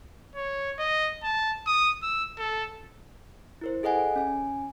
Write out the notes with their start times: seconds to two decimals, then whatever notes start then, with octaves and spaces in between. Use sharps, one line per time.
0.36 C#5
0.79 D#5
1.23 A5
1.67 D#6
2.03 E6
2.38 A4
3.61 E4 A#4 C5
3.83 G#4 A4 D#5 F#5 G#5
4.16 C#4 G#5